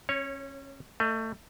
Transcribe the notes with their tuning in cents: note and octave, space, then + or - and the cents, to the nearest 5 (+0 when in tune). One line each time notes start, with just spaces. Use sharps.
C#4 -25 C#5 +0
A3 +25 D#5 +0